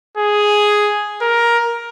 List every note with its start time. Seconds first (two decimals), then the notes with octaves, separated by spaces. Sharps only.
0.17 G#4
1.22 A#4